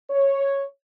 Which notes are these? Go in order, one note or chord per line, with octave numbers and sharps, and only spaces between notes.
C#5